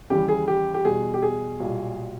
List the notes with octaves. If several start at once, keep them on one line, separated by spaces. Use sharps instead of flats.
D#2 C#3 E3 G3 G4
G#4
G4
G4
E2 B2 G3 G#4
G4
G#4
B1 A#2 G3